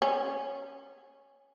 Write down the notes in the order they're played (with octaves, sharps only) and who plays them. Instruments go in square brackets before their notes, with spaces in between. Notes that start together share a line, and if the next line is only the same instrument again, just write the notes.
[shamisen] C#4